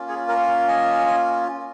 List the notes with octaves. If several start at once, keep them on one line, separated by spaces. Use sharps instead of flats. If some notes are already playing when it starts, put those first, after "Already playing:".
Already playing: A#3 C#4 F4
G#4 C#5
A#4
D#5 G#5